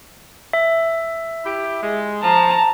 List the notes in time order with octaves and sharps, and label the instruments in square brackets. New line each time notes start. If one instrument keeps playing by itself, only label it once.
[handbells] E5
[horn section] E4 G4
G#3
[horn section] F3 [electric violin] A5 A#5